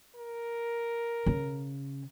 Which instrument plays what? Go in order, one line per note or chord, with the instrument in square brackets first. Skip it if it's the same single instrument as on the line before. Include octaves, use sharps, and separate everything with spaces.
[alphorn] A#4
[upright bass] C#3